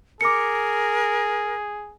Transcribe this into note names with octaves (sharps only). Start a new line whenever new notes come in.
G#4 A#4 D6 C#7